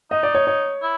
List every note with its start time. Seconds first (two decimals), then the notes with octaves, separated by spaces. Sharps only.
0.11 D#4 D#5
0.23 D5
0.35 C#5
0.47 C#5
0.82 E4